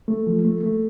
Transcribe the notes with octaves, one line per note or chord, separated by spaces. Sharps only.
A3
F3
A3
A3